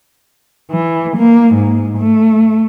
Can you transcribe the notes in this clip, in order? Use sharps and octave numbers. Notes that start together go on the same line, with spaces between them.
E3
A#3
G#2
A3